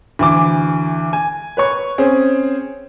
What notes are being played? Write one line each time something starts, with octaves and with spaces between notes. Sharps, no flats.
D2 E3 D6
G#5
B4 C#5 C#6
C4 C#4 G#4